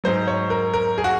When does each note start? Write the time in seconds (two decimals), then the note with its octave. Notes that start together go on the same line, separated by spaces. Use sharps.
0.04 G#2 F#3 C5
0.28 C#5
0.50 A#4
0.74 A#4
0.98 G#4
1.04 F#4